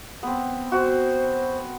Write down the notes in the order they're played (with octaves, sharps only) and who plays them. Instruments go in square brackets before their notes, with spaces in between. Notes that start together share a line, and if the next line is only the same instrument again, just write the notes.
[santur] B3 C4
[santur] F#4 [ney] C5